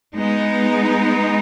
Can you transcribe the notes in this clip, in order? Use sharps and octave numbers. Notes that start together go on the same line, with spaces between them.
G#3 B3 D#4